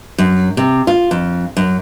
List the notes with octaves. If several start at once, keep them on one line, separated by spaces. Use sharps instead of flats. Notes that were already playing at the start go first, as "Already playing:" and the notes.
F#2
C3
F4
F2
F#2